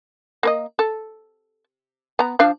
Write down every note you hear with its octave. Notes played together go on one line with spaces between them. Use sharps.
A#3 B4 D#5
A4
B3 A#5
F3 D4 F5